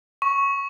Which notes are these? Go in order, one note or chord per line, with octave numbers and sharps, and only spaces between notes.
C#6